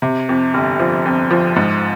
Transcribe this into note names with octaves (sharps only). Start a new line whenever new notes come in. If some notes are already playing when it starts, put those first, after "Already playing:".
C3
F2
G1
F3
F2
F3
G#2